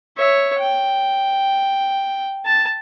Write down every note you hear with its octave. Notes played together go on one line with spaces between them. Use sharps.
C#5 E5
G5
A5